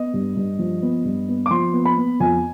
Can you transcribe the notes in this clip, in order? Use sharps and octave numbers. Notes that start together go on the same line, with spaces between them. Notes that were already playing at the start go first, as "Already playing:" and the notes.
Already playing: B3 D#5
G2
G2
F3
B3
G2
B3
D6
F3 C6
B3
B5
B3
F2 G#5